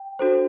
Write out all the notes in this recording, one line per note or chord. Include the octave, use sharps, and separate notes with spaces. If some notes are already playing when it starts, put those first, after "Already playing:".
Already playing: G5
D4 F#4 A4 C5